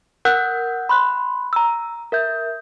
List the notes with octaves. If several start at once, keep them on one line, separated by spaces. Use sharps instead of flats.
A#4 F#5 E6 F#6 G6
B5 C6 F#6
A#5 E6
A#4 E5 G6